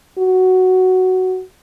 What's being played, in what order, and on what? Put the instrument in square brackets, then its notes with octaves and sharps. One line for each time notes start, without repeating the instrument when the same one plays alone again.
[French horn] F#4